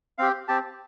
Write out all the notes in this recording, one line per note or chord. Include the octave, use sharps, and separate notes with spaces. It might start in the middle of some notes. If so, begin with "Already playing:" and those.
C4 G4 F5
C4 G4 A5